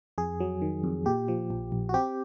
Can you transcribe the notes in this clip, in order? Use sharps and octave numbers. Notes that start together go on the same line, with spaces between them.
F2 G#4
F#3
D#3
F2
A#2 G4
F3
A#1
A#1
F#4
C4 G4